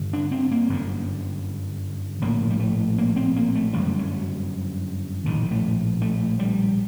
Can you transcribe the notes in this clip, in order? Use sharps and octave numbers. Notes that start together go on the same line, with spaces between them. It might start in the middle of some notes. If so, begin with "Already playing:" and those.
Already playing: G1 G2 D3
D4
C4
A#3
G1 F#2 D3
A#1 A2 A#3
G3
A3
A#3
C4
A#3
A3
G1 F#2 D3 G3
F#3
A#1 A2 D#3
A3
A3
G3